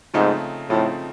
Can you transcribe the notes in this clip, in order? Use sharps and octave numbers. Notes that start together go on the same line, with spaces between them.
G#2 C#3 F3 A3 C4 D#4
A2 C#3 F3 A3 C4 D#4